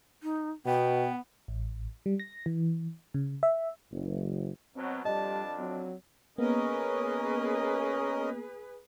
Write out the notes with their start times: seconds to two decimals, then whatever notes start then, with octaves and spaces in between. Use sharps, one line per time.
0.23 D#4
0.66 B2 B3 G5
1.48 A1
2.06 G3
2.20 A#6
2.46 E3
3.14 C#3
3.43 E5
3.92 F#1
4.76 B2 F#3 C4
5.05 F2 G3 D4 D#5 A5
5.59 F#3 C4
6.38 A#3 B3 C#4 G#4 A#4 B4 D#5